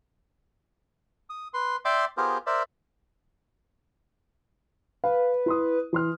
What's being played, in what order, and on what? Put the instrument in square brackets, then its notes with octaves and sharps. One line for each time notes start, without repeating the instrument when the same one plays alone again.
[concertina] D#6
B4 C6
D5 E5 G5 C6 D6
B3 F4 G4 G#4 A#4 C5
A#4 C5 D5 E5
[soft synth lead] B4 [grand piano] F5
[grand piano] E4 C6 D#6
E3 C6 F6